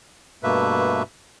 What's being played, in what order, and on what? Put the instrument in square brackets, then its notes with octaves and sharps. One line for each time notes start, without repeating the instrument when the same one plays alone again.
[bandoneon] G2 B2 A3 A#3 B4 E5